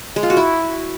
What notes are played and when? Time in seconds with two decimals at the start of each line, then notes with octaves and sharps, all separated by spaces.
0.16 G#3
0.23 F4
0.30 F#4
0.37 E4